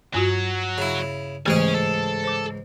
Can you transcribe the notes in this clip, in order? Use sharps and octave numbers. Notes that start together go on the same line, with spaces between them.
G2 F#3 F4 F#4
C#3 E4
C#2 G#2 E3 A3 C#4 G4 G#4 G#5
A4
C5 D6